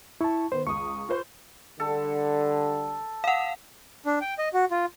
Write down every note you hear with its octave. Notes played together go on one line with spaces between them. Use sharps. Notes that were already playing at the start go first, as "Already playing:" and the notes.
E4 A5 C#6
D#3 B3 C5
C#2 C#6 D#6
F4 B4 C5
D3 G3 A4
F5 F#5
D4
G5
D#5
F#4
F4